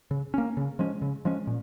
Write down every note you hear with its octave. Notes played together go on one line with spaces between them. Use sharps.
C#3
A#3 C#4
C#3
F3 G#3 C#4
C#3
F3 G#3 C#4
A#2